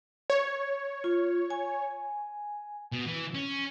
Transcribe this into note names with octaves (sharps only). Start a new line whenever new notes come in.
C#5
F4
G#5
B2
E3
C#4